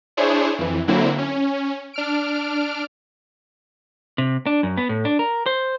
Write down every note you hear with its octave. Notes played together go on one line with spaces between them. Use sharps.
D4 E4 G#4 C5 C#5
F2 E3
D3 F#3 A#3 C4 E4
C#4
D4 F6 D7
C3
D4
F#2
B3
A2
D4
A#4
C5